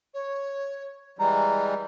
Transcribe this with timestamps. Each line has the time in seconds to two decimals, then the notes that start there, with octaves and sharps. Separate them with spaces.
0.14 C#5
1.19 E3 G3 G#3 A#5